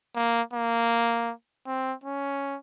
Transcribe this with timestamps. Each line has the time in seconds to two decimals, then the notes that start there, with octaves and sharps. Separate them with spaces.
0.15 A#3
0.53 A#3
1.67 C4
2.04 C#4